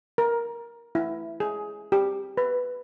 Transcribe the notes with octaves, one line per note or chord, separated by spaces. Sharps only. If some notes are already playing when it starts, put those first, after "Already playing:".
A#4
E4
G#4
G4
B4